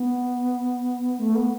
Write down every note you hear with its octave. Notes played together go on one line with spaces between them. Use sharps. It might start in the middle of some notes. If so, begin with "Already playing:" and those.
Already playing: B3
A3
B3